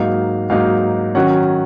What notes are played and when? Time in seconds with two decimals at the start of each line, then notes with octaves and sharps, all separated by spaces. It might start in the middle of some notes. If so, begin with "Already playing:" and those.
Already playing: G#2 F#3 A#3 D#4 F5
0.50 G#2 F#3 A#3 D#4 F5
1.15 D#3 F#3 C#4 F#5